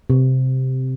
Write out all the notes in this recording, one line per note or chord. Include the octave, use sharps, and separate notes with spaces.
C3